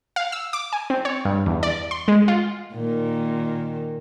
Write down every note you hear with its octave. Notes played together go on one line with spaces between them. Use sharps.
F5
E6
D6
G#5
C4
C#5
G2
E2
D5
C6
G#3
F4
A#2 D#3